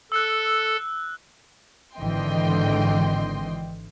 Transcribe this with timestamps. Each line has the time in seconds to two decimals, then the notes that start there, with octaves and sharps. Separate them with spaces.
0.12 A4 E6 F#6
1.95 G#1 D3 E3 D#5 G5 C6